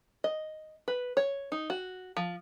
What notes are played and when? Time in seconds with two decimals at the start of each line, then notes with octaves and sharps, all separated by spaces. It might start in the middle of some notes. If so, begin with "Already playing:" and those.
0.24 D#5
0.88 B4
1.17 C#5
1.52 D#4
1.70 F#4
2.17 F3